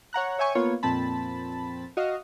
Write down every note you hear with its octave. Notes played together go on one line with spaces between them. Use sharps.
C#5 F#5 A#5 F#6
C#5 E5 G5 G#5 C#6
A#3 B3 F4 C#5
F2 A#2 C4 A5 B5
F#4 D#5 F5